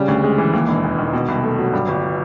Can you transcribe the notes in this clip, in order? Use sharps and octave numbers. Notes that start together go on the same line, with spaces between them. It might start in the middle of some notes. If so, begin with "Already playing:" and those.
Already playing: C#3 G3
D2
G#3
E3
D#2
E1
E1
D#3
B2
C2
A3
F#3
G2
G1